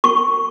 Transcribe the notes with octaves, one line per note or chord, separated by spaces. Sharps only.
C#6